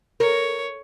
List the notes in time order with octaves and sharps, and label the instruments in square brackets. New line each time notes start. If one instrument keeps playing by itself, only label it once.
[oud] A#4 [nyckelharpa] C#5